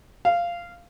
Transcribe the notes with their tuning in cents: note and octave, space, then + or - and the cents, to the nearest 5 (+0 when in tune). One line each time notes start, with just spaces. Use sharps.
F5 -10